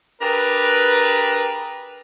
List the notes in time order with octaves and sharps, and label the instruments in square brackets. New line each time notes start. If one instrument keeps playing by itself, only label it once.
[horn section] D4 G4 G#4 A#4 B4